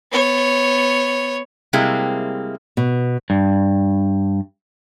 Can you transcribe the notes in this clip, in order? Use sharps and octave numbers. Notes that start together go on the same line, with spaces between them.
B3 C#5
C3 G3 G#3 A#3 C4 E4
B2
G2